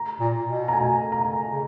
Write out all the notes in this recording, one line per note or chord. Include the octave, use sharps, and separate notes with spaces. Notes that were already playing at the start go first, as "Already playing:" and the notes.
Already playing: A#5
A#2
B2
A#5
G#5
A#5
C#3